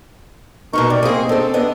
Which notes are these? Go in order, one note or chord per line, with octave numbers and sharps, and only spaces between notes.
B2 B3 D#4 A#4 C#6
C3 D5
A#3 C4 G#4 D#5
D3 C4 A4
B3 D4 D#5